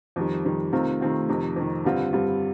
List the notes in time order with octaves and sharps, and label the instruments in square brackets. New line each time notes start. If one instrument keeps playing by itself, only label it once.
[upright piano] F2 D#3 G3
F2 D#3 G3
C3 D#3 A3 C4 F4
C3 D#3 A3 C4 F4
F2 C3 D#3
F2 C3 D#3
G2 D3 G3 C4 F4
G2 D3 G3 C4 F4